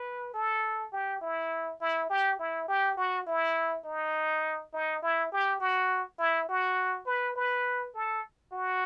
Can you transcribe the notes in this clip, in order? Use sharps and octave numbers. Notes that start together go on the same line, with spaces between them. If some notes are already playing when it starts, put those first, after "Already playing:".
Already playing: B4
A4
G4
E4
E4
G4
E4
G4
F#4
E4
D#4
D#4
E4
G4
F#4
E4
F#4
B4
B4
A4
F#4